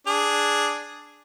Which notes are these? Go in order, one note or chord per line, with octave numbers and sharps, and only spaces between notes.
D4 G#4